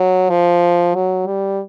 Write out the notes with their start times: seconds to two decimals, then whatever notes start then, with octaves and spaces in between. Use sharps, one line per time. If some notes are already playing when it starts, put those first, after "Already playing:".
Already playing: F#3
0.30 F3
0.95 F#3
1.27 G3